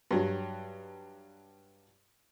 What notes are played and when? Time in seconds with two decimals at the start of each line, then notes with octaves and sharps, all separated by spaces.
0.11 G2 F#3